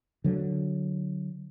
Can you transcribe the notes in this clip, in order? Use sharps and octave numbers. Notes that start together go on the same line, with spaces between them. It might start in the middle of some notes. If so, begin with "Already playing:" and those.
D3 F#3